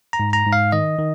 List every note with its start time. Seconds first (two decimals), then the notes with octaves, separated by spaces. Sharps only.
0.13 A#5
0.20 G#2
0.33 A#5
0.46 G#2
0.53 F5
0.72 D#3 D#5
0.99 D#3